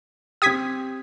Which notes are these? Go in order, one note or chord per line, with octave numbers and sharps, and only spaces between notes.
C4 G4 D#6 G#6 B6